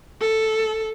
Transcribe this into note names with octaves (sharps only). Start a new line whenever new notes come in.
A4